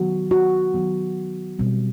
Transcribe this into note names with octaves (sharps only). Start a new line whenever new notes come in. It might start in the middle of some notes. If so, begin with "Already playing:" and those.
Already playing: D#3 F#3 B3 F#4
F#4
D#3 F#3 B3
B2 G3 C4